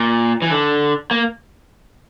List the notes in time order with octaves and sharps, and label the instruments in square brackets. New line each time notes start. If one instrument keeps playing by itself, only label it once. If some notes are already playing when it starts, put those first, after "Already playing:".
Already playing: [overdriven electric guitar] A#2
E3
D3
A#3